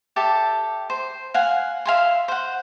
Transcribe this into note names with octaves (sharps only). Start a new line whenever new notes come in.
G4 A4 E5 A5
C5
F5 F#5 G#5
E5 F5 G#5 C6
C5 F#5